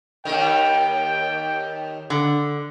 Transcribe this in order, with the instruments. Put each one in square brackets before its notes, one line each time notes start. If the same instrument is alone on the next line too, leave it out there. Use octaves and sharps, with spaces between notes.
[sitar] D#2 D#3 [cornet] G5
[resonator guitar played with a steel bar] D3